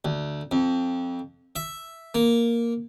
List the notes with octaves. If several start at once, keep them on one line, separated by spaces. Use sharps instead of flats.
D2
F2
E5
A#3